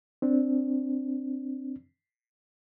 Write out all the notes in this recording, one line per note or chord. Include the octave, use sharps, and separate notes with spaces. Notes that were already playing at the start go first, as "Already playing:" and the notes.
C4 D4